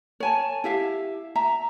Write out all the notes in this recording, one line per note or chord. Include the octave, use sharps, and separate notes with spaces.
C#5 G#5 A5
E4 G4 E5 F5
E5 A#5